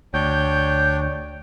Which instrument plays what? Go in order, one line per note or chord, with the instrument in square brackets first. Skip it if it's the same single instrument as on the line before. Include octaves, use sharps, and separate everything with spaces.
[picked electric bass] D2 [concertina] D4 G5 [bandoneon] C#5 [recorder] G6